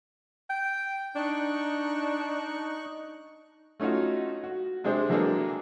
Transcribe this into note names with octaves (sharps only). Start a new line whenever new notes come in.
G5
D4 D#4 C#6 F#6
A3 C#4 D#4 F4 F#4
F#4
C3 G#3 D4 G#4 C5
E3 F#3 A#3 D4 G#4 A4